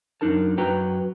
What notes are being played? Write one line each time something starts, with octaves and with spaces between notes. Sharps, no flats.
F#2 C3 D4 D#4 A#4 A5
F#2 F#4 B4 G5 A#5